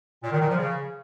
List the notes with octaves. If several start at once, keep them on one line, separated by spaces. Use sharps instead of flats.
A#2
D#3
A#2
F3
C#3